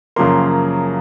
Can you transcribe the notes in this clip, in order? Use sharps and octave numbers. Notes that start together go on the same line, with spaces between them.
F#2 C#3 F3 A#3 C6